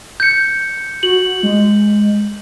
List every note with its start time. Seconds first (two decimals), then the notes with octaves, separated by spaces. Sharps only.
0.20 G6 C#7
1.03 F#4 F#7
1.43 G#3